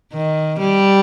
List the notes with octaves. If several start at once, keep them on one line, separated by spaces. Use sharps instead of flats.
D#3
G3